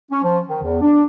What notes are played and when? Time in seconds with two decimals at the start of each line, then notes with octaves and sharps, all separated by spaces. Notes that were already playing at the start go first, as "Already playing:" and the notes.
0.11 C#4
0.23 F3
0.47 D#3
0.63 E2
0.81 D4